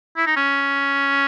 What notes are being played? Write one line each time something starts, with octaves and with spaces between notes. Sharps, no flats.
E4
D#4
C#4